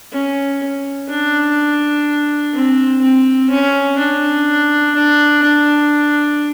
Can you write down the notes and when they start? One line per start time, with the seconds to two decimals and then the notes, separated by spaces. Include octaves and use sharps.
0.13 C#4
1.10 D4
2.54 C4
3.01 C4
3.50 C#4
3.98 D4
4.95 D4
5.43 D4